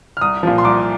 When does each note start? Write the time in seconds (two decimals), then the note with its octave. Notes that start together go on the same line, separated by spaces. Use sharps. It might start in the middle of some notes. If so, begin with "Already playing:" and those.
0.17 F6
0.21 C2 D#6
0.43 A#2 F3
0.58 C6
0.64 C2 D6